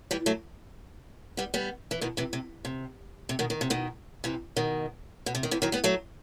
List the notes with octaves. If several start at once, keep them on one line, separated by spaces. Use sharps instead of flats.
E3 G3
F#3 A3
G3 B3
G3 B3
E3
B2 D#3
C3 E3
C3
C3
C3
B2 D#3
D#3
C3
B2 D#3
C3 E3
B2 D#3
B2
C3
D#3
C3 E3
D#3 F#3
G3 B3
F#3 A3